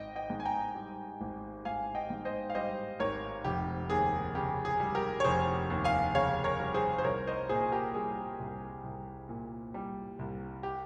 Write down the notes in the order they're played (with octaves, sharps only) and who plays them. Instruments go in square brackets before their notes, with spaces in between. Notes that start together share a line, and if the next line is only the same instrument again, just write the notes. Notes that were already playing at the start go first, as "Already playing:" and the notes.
Already playing: [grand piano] G#1 D#5 G5
D#5 G5
G#2
G#5
G5 A#5
G3
G#1
G#1 F5 G#5
D#5 G5
G#2
C5 D#5
F5
G3 C5 D#5
G#1 A#4 C#5
F1 G4
D#2 G#4
C#3 G4
G#4
G3
G4 A#4
C#5
F1 G#4 C5
D#2
F5 G#5
C#3 C#5 F5
A#4 C#5
G3
G#4 C5
C5
C2 A#4 C#5
C5 D#5
A#2 G#4 C5
G#4
G4 A#4
G3 G#4
C2
C2
A#2
G3
C2
G4